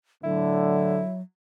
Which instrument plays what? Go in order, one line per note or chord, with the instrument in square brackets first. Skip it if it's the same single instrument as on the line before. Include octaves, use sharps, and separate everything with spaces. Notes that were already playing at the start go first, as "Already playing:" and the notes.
[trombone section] A2 D3 [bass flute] F#3 [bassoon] E4